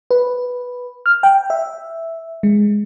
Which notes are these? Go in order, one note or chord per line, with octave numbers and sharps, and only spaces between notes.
B4
F6
G5
E5
G#3